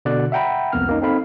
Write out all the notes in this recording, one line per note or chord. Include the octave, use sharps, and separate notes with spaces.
B2 D3 D5 F#6
E5 F#5 G5 A#5 B5
C2 F2 A#3 B3 F6
A#3 C#4 D#4
C4 D#4 A4 F5 B5